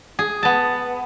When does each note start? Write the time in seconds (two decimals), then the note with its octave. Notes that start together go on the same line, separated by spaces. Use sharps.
0.19 G#4
0.43 B3 A5